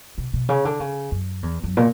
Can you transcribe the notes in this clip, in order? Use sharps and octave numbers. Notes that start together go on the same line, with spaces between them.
B2
B2
C#3
D3
C#3
F#2
E2
F#2
A#2